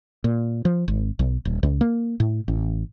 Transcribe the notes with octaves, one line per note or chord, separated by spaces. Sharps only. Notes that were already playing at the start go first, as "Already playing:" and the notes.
A#2
F3
G#1
B1
D#1
C#2
A#3
A2
A1